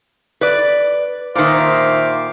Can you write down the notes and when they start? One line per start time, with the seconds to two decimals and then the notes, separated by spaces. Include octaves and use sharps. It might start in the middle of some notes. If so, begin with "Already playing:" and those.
0.41 B4 D5
1.35 A#2 D#3 C5 E5 F5 D6